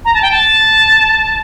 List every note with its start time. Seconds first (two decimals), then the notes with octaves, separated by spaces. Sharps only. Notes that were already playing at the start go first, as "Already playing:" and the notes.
0.04 A#5
0.14 A5
0.22 G5
0.31 A5